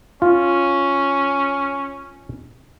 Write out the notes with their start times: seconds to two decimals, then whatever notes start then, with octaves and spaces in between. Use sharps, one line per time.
0.22 C#4 F4